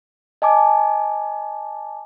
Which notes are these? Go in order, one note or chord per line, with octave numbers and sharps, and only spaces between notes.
D#5 G#5 A5 D6